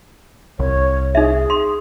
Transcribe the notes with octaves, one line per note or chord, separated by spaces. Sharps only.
C2 C#5
D#4 G#4 E5
C6